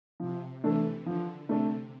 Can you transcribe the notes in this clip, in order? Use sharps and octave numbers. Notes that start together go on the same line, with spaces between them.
C3 F3
C3 E3 A3 D4 A4
D3 F3
C3 A3 D4 A4